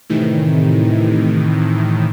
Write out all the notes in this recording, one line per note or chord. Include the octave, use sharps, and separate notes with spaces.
A2 C3 D#3 E3